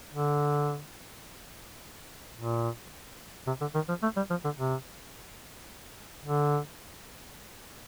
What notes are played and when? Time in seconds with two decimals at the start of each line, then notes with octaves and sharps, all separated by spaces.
0.13 D3
2.36 A#2
3.47 C3
3.61 D3
3.75 D#3
3.89 F3
4.03 A3
4.16 G3
4.30 F3
4.45 D3
4.58 C3
6.25 D3